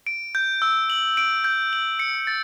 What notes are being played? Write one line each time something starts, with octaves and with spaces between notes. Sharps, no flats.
D7
G6
E6
F#7
D7
G6
F#7
C#7
A6